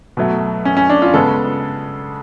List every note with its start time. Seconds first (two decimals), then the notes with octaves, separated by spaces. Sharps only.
0.17 B2 F#3 A3
0.65 C#4
0.77 C#4
0.90 D4
1.02 F4
1.13 C#3 G#3 B3 A4